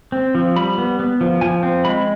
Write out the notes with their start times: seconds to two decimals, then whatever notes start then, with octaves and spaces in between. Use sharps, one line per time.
0.12 C4
0.35 F3
0.56 G3 B5
0.78 B3
0.99 B3
1.21 F3
1.41 F3 G#5
1.63 C4
1.85 G#3 B5